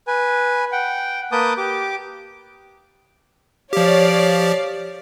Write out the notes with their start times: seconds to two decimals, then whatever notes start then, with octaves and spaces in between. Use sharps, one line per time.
0.07 B4 G#5
0.72 F#5 G5
1.32 A#3 B4 A5 D6 D#6 G6
1.58 G4 D6
3.73 F3 G4 C#5 D5 F5